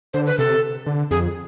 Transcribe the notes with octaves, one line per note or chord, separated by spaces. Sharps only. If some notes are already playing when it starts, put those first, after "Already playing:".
D3 C5
B4
C3 A4
D3
F2 G#4